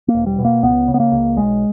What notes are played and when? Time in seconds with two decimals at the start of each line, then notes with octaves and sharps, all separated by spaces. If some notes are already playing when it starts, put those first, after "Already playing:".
0.08 A#3
0.15 E1
0.26 G3
0.39 B2
0.45 A#3
0.63 C#2 B3
0.88 C#3
0.94 B3
1.00 A#3
1.12 C#2
1.37 B1 G#3